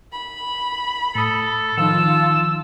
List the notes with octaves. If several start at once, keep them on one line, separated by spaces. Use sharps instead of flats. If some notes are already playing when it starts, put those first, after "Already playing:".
B5
A2 A4 D#6
D#3 F3 D#4 F4 A5 E6